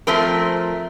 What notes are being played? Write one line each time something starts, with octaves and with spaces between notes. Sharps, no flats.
F3 A3 C4 A#4